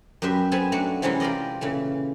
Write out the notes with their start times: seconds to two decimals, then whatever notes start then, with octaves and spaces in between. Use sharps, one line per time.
0.22 F#2 G4 B4 E5 C6
0.52 B3 C4 A4 G#5 A5 B5
0.72 F#3 A3 D4 F#4
1.02 C3 E3 G#3 C#4 D#4 E4
1.20 F4 G4 A#4 D5 D#5
1.61 A#2 C#3 E3 A3